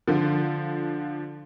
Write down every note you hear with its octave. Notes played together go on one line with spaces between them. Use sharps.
D3 F3